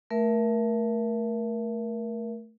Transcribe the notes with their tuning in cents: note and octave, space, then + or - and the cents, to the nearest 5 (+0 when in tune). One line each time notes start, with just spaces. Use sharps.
A3 +5 A#4 +20 E5 +15